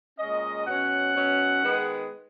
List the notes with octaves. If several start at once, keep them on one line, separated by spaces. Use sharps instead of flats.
A#2 G#3 C#4 D#5
B2 F#3 C#4 F#5
B2 F#3 C#4
D#3 G#3 B3